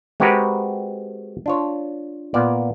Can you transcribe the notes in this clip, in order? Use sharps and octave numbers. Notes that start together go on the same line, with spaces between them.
G#3 C4 F#4 G4 A#4 B4
D4 F4 C#5
A#2 A#3 B3 D5